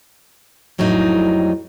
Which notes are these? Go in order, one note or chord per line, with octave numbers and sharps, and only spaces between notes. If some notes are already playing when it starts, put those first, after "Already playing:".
F2 A2 F#3 G3 D#4